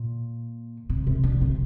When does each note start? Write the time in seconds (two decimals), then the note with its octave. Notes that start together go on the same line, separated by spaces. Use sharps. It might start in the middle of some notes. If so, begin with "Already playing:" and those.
Already playing: A#2
0.90 C3
1.07 C3
1.24 D3
1.41 C3